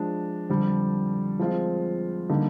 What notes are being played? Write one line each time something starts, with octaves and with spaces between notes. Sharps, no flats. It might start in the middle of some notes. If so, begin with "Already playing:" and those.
Already playing: F3 G#3 D4
F2 D3 G3
F3 G#3 C4 F4
D3 G3 A#3 D#4